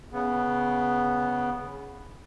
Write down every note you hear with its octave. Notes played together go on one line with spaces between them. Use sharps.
C#3 B3